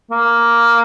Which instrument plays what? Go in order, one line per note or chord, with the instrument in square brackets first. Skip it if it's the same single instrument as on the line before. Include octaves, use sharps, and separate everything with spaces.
[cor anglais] A#3